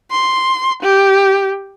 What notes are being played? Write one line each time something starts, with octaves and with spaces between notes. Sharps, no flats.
C6
G4